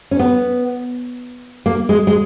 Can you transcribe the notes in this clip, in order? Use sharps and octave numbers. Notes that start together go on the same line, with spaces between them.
C#4
B3
A#3
G#3
G#3